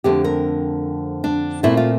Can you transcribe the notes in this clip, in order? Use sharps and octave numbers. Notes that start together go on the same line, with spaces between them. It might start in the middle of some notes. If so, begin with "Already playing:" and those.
F2 D3 A3 C4 G4
A#4
D4
A#2 A3 C4 E4
F4